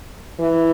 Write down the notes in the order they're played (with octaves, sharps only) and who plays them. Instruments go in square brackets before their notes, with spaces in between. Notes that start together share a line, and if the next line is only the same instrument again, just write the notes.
[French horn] E3